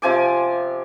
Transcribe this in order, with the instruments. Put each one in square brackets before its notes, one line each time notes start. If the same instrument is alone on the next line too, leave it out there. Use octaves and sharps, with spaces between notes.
[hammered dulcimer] C3 F3 G#5 D6